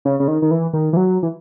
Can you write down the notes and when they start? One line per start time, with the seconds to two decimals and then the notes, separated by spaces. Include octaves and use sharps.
0.05 C#3
0.20 C#3
0.28 D#3
0.42 D#3
0.51 E3
0.73 D#3
0.93 E3
0.97 F#3
1.23 E3